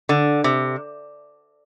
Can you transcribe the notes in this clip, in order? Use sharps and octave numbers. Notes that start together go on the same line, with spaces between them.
D3
C3